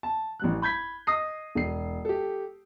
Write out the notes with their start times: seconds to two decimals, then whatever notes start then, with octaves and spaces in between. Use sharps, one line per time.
0.03 A5
0.40 A1 G3 F#6
0.62 B5 G6 G#6 B6
1.07 D#5 D#6 A#6 C7
1.55 E1 C7
2.05 G4 A4